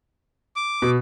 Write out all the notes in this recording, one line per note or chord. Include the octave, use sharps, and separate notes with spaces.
D6
B2